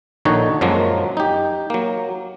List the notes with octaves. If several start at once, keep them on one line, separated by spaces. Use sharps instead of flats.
A#1 D3 D#3 D#4 F#4 C#5
F#2 F3 F#3 G#3 A#3
D#4 G4
F#3 A#3